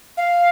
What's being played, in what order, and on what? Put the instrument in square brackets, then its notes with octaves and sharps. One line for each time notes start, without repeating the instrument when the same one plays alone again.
[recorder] F5